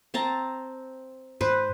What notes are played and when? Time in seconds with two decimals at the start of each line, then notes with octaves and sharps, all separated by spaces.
0.14 C4 A5 A#5
1.41 G#2 B4 C5